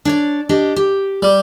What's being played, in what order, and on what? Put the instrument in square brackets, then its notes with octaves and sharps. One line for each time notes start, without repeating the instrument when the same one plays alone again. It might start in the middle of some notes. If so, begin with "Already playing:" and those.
[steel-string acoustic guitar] D4 C#5 D5
D4 G4 D#5
G4
[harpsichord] G3